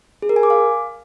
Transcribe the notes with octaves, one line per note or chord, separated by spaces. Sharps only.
G#4
A#4
G#5
D6
F5